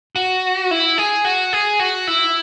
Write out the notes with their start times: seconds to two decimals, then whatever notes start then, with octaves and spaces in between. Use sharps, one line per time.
0.16 F#4
0.71 E4
0.98 G#4
1.25 F#4
1.53 G#4
1.80 F#4
2.07 E4